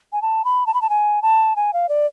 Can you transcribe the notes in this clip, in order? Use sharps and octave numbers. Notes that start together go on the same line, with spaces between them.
G#5
A5
B5
A5
B5
A5
G#5
A5
G#5
F5
D5